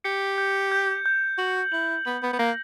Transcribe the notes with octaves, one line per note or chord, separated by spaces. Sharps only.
G4 C#7
G6
G6
G6
F#4 F#7
E4 F#7
B3 F#7
B3
B3
A#3 A#6